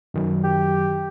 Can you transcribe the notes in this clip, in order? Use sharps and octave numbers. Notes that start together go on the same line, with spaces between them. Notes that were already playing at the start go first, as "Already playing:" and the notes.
F#2 D#3 F#3
G4